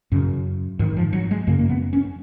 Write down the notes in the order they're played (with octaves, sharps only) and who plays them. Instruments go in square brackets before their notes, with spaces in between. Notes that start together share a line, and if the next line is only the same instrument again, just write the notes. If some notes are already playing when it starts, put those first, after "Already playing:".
[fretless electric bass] F#2 C#3
G#2 D#3
F3
F#3
G#3
F#2 C#3 A#3
A#3
B3
C#4